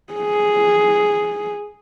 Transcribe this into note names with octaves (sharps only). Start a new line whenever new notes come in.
G#4